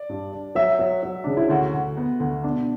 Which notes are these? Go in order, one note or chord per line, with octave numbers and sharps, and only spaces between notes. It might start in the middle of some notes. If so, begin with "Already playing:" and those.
Already playing: D5
G2
D4
F#3 E5
F#3
F#3
C#3 D4
E4
D2 F#4
D2
B3
D2
B2 D4